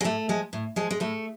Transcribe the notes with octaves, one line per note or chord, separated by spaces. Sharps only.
G#3
A2 A3
F3 G#3
A2
F3 G#3
G#3
A2 A3